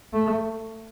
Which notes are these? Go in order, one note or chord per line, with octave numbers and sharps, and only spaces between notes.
A3